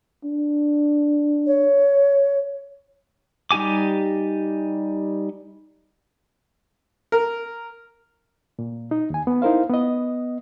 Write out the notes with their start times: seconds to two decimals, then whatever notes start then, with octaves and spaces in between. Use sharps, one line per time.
0.24 D4
1.47 C#5
3.51 G3 D#4 G4 G#5 D6
7.12 A#4
8.59 A#2
8.91 D#4
9.10 D#2 G#5
9.27 B3
9.42 D#4 E4 A#4 C5 F5
9.70 B3 D#5